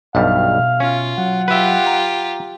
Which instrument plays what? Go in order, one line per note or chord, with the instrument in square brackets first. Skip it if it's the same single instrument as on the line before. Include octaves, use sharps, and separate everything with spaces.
[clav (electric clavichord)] B1 G2 G3 [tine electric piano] B2 E5 [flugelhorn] F5
[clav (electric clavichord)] C#4 [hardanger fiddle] F4
[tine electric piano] F#3 [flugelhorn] F#5
[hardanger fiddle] F4 G4 [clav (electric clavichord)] B4 E5
[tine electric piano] A#5